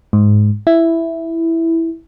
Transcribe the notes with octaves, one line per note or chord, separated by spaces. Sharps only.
G#2
E4